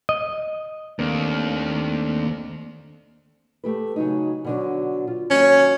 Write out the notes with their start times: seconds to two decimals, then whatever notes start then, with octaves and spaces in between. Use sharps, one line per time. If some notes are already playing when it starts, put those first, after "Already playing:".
0.09 D#5
0.99 D#2 A3 A#3 C4 D4
3.64 A3 G4 B4
3.96 C#3 F#3 D#4
4.44 B2 D3 F#3
5.07 F4
5.30 D#2 F#3 C#4